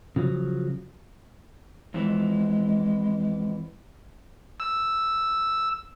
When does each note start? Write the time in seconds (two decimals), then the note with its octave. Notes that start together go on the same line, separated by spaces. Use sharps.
0.16 C#3 F3 F#3
1.94 F2 E3 G#3
4.60 E6